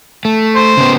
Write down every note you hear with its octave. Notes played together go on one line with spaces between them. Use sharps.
A3
C5
C#3 B3